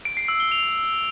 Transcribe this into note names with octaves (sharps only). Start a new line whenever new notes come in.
D7
C7
E6
G7
F7